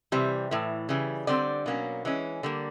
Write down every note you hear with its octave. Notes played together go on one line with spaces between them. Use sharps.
C3 E3 G3
A2 E3
C#3 E3 G3
D3 G3 C4 D5
B2 F#3 A#3 C#4
E3 G#3 C#4
D3 G3 A#3